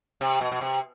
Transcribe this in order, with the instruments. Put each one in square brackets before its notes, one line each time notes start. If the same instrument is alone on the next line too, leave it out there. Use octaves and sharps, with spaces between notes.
[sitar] C3
B2
B2
C3